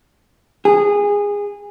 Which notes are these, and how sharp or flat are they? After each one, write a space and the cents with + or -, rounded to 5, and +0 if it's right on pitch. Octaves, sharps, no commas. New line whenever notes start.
G#4 -20